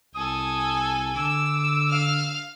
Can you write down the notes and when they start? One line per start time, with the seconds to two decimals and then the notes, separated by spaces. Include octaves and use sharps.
0.15 C2 A4 G#5 D#6
1.16 D3 D6 E6
1.89 F5 F6